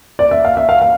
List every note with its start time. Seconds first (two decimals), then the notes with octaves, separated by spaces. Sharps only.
0.19 D5
0.31 E5
0.45 F5
0.57 E5
0.69 F5
0.82 F5